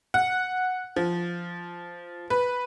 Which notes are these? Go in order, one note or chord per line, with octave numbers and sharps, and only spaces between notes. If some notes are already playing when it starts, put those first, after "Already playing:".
F#5
F3
B4